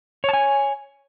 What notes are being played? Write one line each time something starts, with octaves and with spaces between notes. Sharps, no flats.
C#5 G#5 A5